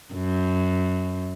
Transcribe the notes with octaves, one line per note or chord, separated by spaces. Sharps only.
F#2